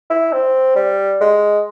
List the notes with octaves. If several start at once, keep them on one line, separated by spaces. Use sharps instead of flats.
E4
C4
G3
G#3